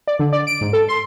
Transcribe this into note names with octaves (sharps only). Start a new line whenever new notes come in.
D5
D3
D5
D7
G#2
A4
C6